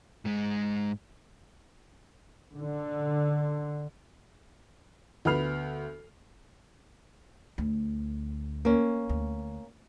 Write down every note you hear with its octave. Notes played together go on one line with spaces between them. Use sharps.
G#2 G#3
D3
D2 B3 B5 F6 C7 F7
D2
A#3 C#4
D2